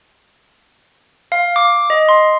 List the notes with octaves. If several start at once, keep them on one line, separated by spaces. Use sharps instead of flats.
F5
D6
D#5
C6